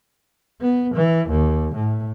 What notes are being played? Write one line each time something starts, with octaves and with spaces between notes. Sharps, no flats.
B3
E3
D#2
A2